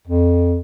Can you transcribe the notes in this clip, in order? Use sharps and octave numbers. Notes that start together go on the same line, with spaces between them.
F2